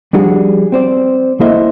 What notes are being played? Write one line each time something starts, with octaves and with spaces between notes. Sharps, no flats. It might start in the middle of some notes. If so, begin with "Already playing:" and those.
F3 G3 D4 F#4 G#4
C4 C5 D5
A#3 E4 A4 C5 D#5 E5